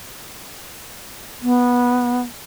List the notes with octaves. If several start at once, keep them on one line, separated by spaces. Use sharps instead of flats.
B3